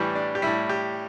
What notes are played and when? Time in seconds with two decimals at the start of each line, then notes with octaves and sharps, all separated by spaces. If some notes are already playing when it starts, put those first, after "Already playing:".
Already playing: A2 E3 G3 G4
0.15 D4
0.35 G4
0.42 A2 G3 E4
0.69 G4